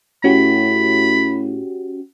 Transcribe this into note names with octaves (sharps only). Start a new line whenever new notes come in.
A2 C#4 F#4 G4 B5